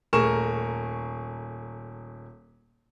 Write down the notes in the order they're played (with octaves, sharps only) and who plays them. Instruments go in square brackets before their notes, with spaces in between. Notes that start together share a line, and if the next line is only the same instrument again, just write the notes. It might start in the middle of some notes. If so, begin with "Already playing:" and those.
[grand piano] D#1 A3 G#4 A#4 C#6 E7